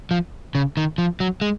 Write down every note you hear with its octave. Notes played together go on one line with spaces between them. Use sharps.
F3
C#3
D#3
F3
F#3
G#3